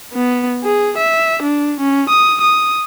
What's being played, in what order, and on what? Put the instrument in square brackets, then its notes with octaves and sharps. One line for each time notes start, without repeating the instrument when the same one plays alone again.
[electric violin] B3
G#4
E5
D4
C#4
D#6
D#6